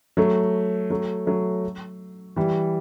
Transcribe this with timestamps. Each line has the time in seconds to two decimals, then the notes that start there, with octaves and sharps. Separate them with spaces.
0.17 F#3 A3
0.90 F#3 A3
1.26 F#3 A3
2.36 E3 G3